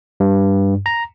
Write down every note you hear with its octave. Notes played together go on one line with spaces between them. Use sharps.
G2
A#5